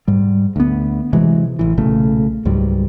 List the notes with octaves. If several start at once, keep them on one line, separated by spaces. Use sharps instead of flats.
G#2 G3
D2 B3
C3 E3 F#3 G#3
A1 E3
B1 A#2 C#3 A3
C#2 G#2 F#3 G3